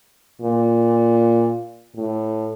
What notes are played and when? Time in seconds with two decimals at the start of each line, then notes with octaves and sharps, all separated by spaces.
0.41 A#2
1.96 A2